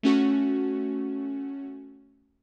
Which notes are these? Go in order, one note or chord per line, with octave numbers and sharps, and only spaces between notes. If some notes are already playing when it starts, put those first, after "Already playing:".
A3 C#4 F#4